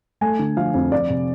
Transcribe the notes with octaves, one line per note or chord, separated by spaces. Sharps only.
A3 G#5
D3
F3 F5
F2
F2 D5
C3